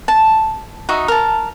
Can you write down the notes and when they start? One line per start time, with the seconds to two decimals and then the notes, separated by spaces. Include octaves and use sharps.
0.08 A5
0.89 D#4 F#4 D#5 E5
1.08 A#4 A5